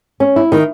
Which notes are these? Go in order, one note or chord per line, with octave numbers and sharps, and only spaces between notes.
C#4
E4
D#3